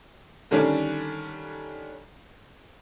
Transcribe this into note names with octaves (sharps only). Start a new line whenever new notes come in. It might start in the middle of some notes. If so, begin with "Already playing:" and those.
D3 D#3 G3 C#4 D4